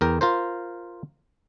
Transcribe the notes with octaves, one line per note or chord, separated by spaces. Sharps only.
E2 A#4 G5
F4 A#4 C5